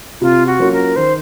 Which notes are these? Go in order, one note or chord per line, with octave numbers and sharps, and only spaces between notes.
C3 F4
F#4
F#3 A#3 C#4 F4
A#4
D#3 C5